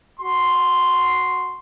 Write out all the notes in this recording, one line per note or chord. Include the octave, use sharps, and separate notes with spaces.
F#4 C6